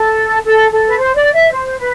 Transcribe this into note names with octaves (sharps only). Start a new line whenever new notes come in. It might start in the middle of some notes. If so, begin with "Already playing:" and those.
Already playing: A4
A4
A4
B4
C5
D5
E5
C5
B4